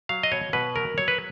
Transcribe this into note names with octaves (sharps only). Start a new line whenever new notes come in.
F#3 F5
D#5
B2 C#5
B2 B4
F#3 A#4
F#3 C#5
B4